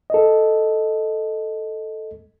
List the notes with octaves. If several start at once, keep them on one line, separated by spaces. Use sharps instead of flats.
A4 D#5